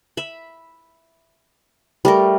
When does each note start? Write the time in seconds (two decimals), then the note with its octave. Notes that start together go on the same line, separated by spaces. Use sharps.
0.17 E5 B5
2.05 G3 A3 A#4